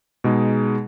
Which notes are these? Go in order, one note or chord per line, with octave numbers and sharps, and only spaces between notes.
B2 G#3 D#4 G#4